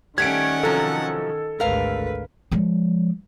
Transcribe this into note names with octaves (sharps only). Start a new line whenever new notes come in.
D#3 G3 A3 C#4 F#5 G#6 D7
C3 F3 F#3 A4
G#1 D2 A#4 B4 F5
F3 G#3